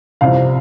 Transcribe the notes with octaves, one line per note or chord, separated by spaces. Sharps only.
C2 C3 F3 F5